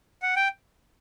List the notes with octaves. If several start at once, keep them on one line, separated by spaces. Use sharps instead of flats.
F#5
G5